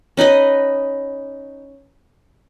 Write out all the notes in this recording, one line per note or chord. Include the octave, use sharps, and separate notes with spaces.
C#4 D#4 B4 D#5